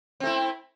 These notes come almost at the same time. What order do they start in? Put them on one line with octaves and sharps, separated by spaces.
C4 A3 E4